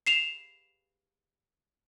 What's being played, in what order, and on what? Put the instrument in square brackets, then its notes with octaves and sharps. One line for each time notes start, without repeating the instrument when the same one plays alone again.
[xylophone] C7 E7 F7